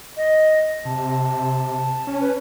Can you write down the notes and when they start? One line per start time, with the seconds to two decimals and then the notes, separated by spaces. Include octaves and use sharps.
0.17 D#5
0.85 C3 A5
2.07 C#4
2.21 B4